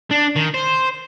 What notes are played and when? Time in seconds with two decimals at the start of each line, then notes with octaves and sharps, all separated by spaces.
0.11 D4
0.36 D#3
0.54 C5